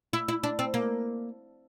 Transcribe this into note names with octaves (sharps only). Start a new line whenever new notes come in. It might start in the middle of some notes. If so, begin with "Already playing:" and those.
E4
E4
D4
C4
A#3